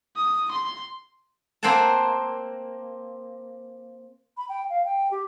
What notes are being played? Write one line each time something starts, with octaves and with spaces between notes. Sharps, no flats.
D#6
C6
A#3 C4 C5 F#5 G#5 A5
B5
G5
F5
G5
G4